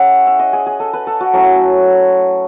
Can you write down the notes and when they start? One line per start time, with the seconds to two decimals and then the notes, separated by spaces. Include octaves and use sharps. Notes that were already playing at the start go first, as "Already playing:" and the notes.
Already playing: C#4 E4 G#4 E5 F#5
0.27 E5
0.39 D#5
0.53 G#4
0.66 G#4
0.80 A4
0.93 B4
1.07 A4
1.21 F#4
1.33 F#3 A3 C#4 E4